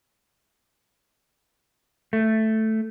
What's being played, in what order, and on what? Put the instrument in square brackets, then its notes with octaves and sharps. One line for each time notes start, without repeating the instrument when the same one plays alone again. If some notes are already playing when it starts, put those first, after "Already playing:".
[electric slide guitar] A3